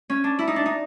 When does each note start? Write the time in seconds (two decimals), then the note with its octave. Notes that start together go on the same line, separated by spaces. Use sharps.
0.10 C#4
0.24 D4
0.39 E4
0.47 D#4
0.56 D4
0.66 D#4